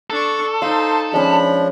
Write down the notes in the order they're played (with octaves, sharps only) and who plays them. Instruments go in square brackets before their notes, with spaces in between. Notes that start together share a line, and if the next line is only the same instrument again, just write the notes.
[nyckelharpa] D4 C#6 [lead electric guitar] A4
[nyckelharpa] D#4 C5 [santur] F5 [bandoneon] C6
[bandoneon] F3 D4 [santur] G#3 C#4 [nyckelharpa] B5